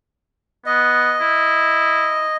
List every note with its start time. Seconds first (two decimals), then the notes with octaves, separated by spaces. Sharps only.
0.66 B3 D#5
1.21 E4